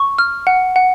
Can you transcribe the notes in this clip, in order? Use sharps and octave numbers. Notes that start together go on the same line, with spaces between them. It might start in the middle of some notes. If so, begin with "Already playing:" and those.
Already playing: C#6
F6
F#5
F#5